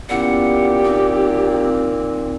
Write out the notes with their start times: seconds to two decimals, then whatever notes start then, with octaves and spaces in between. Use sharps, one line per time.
0.09 A#2 B3 C#4 E4 G4 F#5
0.85 C4 D#4